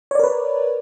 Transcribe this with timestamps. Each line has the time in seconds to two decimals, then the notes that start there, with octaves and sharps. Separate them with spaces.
0.11 C#5
0.15 D5
0.19 A#4
0.24 B4